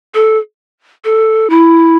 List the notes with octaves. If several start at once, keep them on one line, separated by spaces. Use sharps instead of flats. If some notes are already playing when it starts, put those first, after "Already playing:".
A4
A4
E4